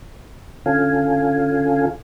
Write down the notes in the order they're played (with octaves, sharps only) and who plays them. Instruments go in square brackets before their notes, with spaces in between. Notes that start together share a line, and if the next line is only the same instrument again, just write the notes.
[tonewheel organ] D3 C#4 F4 A4 F5 G#5